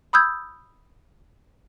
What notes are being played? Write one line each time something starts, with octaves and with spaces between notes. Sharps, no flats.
B5 D#6 E6 G6 G#6